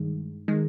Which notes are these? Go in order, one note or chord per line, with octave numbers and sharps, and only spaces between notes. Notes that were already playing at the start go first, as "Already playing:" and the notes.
Already playing: G2 D#3 G#3
D#3 G#3